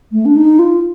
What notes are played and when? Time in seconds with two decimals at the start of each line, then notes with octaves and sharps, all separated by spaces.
0.12 A3
0.25 D4
0.36 D#4
0.59 F4